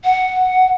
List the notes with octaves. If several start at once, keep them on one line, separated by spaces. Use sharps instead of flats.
F#5